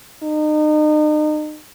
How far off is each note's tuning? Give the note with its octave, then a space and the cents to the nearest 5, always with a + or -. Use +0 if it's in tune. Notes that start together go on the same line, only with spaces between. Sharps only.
D#4 -35